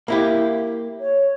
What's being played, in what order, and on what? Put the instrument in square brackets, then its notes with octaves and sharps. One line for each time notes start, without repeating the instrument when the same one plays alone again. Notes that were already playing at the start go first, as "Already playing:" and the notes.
[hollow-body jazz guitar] A#3 E4 G4
[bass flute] C#5